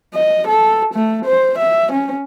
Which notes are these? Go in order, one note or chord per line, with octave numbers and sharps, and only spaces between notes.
D#5
A4
A3
C5
E5
C#4